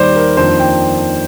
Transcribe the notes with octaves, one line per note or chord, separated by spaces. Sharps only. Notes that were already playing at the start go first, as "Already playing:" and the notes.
Already playing: D#2 D#3 G3 C5 D5
A#4
F2 D#3 A#3 D4 C5
G5